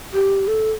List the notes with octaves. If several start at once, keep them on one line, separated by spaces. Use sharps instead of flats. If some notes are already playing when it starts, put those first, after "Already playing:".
G4
A4